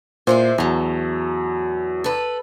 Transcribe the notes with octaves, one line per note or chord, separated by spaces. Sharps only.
A#2 G#3 E4 C5
E2 A2 F#3
A4 B4